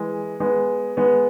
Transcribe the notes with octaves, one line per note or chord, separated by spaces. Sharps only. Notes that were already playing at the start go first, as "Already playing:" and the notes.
Already playing: E3 G#3
G#3 B3
G#3 B3